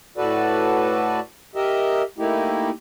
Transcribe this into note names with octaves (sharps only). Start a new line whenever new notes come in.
A2 F#4 A4 B4 D5
G4 A#4 D#5 E5
A3 A#3 D#4 E4 G4